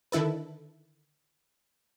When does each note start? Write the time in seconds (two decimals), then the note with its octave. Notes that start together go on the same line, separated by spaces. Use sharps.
0.12 D3 D#3 E4 A4 B4